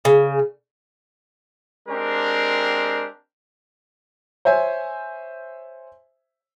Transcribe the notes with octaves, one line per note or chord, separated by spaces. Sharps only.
C#3
G#3 C4 D4 G4 A#4
C5 C#5 E5 G#5